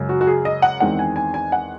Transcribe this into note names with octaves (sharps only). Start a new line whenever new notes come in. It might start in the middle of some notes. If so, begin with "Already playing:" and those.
Already playing: F#2 C#3 G#3
F#4
F#4
G#4
D#5
F#5
E2 D#3 G#3 C4 F#5
G#5
G#5
G#5
F#5